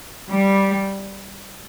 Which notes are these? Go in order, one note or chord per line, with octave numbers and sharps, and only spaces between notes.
G3